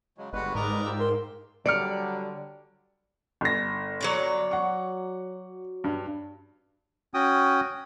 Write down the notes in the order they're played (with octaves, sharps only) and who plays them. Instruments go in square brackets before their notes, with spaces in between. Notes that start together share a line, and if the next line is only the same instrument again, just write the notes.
[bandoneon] C#3 F#3 G#3
[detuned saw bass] G1 [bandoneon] G3 G#3 B4 [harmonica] F#4
[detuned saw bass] G#2 [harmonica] A#4 D5 D#5
[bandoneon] F4 G4 E6
[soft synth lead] A#4 [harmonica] C6
[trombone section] D3 F#3 G3 [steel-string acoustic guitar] D5 [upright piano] F6 C#7 D7
[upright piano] G1 A#6
[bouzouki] F#3 C#5 D5
[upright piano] F#5 C#6
G2
[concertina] C#4 F#4 G5 D#6